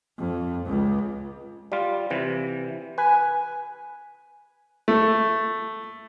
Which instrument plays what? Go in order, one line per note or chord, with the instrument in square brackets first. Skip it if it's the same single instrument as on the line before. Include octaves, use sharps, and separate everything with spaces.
[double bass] F2
C#2
[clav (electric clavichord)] G3 F4
C3 E3
[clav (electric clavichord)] B4 [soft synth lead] G#5
[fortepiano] A3